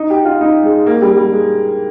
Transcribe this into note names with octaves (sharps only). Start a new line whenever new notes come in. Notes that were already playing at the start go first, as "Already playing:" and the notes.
Already playing: D#4
G4
F4
D#4
G#3
A#3
G3
G3
G#3